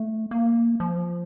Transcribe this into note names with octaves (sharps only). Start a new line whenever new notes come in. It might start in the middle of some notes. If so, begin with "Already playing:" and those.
Already playing: A3
A#3
F3